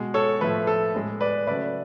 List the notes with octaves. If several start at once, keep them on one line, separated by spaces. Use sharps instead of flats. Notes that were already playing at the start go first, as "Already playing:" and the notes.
Already playing: B2 G#3
A4 C#5
A2 F3 A3 B4
A4
A2 G#3
B4 D5
C#3 F#3 A3 B4 D5